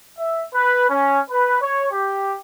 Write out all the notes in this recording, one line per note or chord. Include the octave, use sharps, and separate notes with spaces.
E5
B4
C#4
B4
C#5
G4